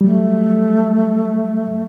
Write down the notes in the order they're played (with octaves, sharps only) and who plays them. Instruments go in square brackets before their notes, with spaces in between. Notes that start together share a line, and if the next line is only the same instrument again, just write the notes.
[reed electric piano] F#3 G3 [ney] A3